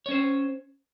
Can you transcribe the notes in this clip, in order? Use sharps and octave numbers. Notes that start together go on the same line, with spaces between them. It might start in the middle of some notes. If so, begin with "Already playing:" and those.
C#4 C5 C#5